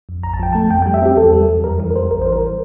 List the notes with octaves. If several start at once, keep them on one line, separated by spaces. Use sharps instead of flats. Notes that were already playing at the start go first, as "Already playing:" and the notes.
F2
A1 A#5
A5
F3 G5
A3 A5
F2 G5
G5
G3
E5
C4 G4
E2 A4
G3
E2
F2 A#4
E3 A#4
A#4
G3 C5
A1 A#4
E3 C5
A#4